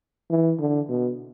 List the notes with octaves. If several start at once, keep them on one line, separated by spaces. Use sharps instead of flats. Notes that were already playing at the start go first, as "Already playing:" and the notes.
E3
D3
B2